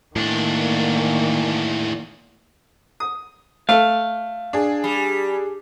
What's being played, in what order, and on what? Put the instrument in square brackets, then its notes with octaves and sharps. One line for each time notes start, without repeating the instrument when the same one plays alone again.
[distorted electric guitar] E2 D4 [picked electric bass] A2 [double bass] D#3 A#3
[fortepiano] D#6
[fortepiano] A3 [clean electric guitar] F5
[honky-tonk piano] D4 G#4
[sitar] G3